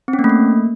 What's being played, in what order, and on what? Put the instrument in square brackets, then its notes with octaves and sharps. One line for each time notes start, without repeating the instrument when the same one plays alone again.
[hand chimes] C4
C#4
A#3
A3
A#3